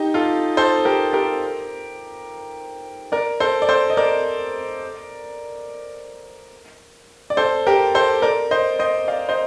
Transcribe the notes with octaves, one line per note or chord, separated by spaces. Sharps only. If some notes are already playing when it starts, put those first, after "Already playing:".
Already playing: D#4 G4
F4 A4
A4 C5
G4 A#4
G4 A#4
A#4 D5
A4 C5
D5
A4 C5
D#5
A#4 D5
D5
A4 C5
G4 A#4
A4 C5
A#4 D5
C5 D#5
C5 D#5
D5 F5
C5 D#5